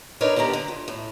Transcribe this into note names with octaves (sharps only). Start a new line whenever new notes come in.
D4 D#4 A#4 B4 C#5
D3 D#3 B3 G4 A#5
D3
A#2
A2